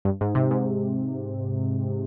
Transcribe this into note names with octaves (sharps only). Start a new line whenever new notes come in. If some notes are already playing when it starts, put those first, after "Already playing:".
G2
G#2
C3
G#2